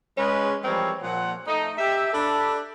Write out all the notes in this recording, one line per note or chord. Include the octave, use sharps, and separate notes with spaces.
G#3 C#4 B4
E3 F3 G3 C4 A#4 C#5
A#2 F3 F#5
A3 D#4
G4 E5
D4 A4 B5